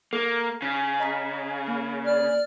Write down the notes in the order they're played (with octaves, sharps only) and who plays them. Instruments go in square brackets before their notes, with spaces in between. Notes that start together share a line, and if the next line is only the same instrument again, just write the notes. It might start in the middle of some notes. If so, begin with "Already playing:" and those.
[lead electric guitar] A#3 [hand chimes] A4
[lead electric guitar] C#3 [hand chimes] B6
[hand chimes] D#5 A#5 B6
A#3
[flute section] D5 F6